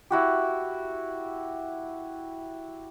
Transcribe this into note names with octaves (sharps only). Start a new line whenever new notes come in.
E4 F#4 G4